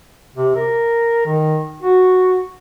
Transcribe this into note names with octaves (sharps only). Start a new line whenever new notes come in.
C3
A#4
D#3
F#4